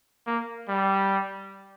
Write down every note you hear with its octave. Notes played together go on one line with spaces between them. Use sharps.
A#3
G3